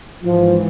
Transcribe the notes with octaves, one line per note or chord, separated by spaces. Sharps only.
G#1 G#2 E3 F3